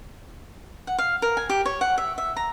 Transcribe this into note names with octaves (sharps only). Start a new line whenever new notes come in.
F#5
F5
A#4
G#5
G4
C#5
F#5
E5
E5
A#5